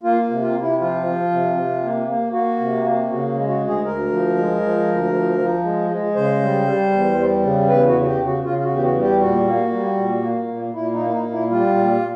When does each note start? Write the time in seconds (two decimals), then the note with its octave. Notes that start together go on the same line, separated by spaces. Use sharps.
0.03 A#3 F4
0.30 C3
0.42 F4
0.55 C3
0.61 E4
0.80 F3 F4
1.06 F3
1.31 C3
1.57 C3
1.83 A#3
2.08 A#3
2.32 A#3 F#4
2.59 C3
2.85 A#3
3.09 C#3 F#4
3.35 G#3
3.48 F#4
3.60 D2
3.67 G#4
3.85 D2 A#4
4.11 F3
4.37 G#3
4.62 F3
4.88 D2
5.13 F3
5.39 F3
5.64 G#3
5.90 G#3
6.15 C#3 C5
6.41 G3
6.66 G3
6.92 E2
7.17 G3
7.43 C#3
7.68 E2 B4
7.87 F#4
7.93 C#3
8.02 F#4
8.06 G4
8.19 C#3
8.25 F#4
8.44 C#3 F4
8.58 F4
8.64 F#4
8.70 E2 G4
8.83 F#4
8.95 G3
9.02 G4
9.20 A#2 F#4
9.46 A#3
9.72 G3
9.97 A#2
10.22 A#3
10.48 A#2
10.74 A#2 E4
10.93 D#4
10.99 A#3
11.07 E4
11.12 D#4
11.25 A#2
11.31 E4
11.50 G3 F4
11.76 A#2